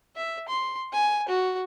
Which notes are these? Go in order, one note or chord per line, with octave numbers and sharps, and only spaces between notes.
E5
C6
G#5
F#4